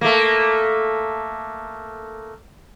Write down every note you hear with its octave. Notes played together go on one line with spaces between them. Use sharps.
A3 A#3